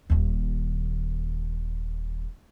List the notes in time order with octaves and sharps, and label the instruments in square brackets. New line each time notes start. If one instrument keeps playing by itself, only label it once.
[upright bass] D#1 D#2